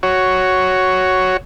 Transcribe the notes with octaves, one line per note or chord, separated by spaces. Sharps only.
F#4 C#5